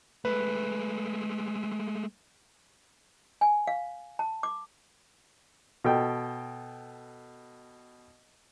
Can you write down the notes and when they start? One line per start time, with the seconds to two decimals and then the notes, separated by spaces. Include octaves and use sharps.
0.25 G#3 A3 B4
3.41 G#5
3.67 F5
4.19 A5
4.43 D6
5.84 B2 A4 G5